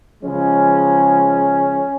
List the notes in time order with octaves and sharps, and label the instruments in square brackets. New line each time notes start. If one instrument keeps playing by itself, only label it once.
[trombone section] C#3 F3 G#3 C#4